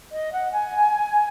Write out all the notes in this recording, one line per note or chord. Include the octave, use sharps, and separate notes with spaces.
D#5
F#5
G#5